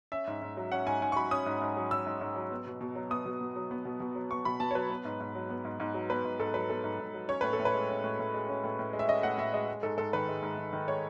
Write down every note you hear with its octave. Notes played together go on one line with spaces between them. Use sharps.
C#4 E5
G#2
G#2
F#3
C#4 F#5
G#2 G#5
G#2 G#5
C#6
F#3 B5
C#4 D#6
G#2
G#2
F#3
C#4 E6
G#2
G#2
F#3
B3
B2
B2
F#3
B3 D#6
B2
B2
F#3
B3
B2
B2
F#3
B3 C#6
B2 B5
B2 A5
C#5
F#3 B4
B3
G#2
G#2
F#3
B3
G#2
G#2
F#3
B3 B4
G#2
G#2 A4
F#3 B4
B3 A4
G#2
G#2
F#3
C#4 C#5
A2 B4
A4
A2
B4
G#3
C#4
A2
A2
G#3
C#4
A2
A2
G#3
E5
C#4 D#5
A2 F#5
A2 E5
G#3 D#5
G#3
G#2 A4
G#2 A4
D#3 B4
G#3
G#2
G#2
D#3
G#3 C#5